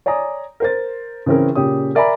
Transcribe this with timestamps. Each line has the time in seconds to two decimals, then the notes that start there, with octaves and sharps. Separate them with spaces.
0.06 C#5 D5 G#5 A#5 D#6
0.60 A#4 C5 A6
1.26 C#3 E3 C4 C#4 A#4
1.55 A#2 C#3 G4 C#5 D#6
1.95 A#4 D5 E5 G#5 A#5 B5